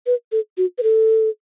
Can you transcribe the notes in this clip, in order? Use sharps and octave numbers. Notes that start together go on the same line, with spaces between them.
B4
A4
F#4
B4
A4